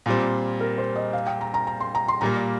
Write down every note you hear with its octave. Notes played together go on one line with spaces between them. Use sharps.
A#2 G3 C4 F4
A#4
C5
D#5
F5
G5
A#5
A#5
A#5
C6
A#5
C6
A#2 G3 A#3 A#5